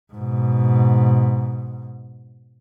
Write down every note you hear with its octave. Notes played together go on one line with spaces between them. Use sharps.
G#2 B2